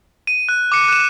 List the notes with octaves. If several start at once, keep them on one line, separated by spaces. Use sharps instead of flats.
D#7
F#6
D6 C#7
F#6 E7